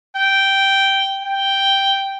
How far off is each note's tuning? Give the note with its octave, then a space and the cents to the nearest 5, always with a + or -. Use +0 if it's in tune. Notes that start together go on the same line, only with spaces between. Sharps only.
G5 -5
G5 +0